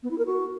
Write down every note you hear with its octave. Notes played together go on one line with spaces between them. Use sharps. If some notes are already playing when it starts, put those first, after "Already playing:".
B3
E4
A#4
F#4